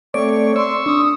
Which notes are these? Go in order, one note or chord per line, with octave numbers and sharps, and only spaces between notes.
A3 C4 C#5 D5 C#6
C6 C#6 E6
D4 D#6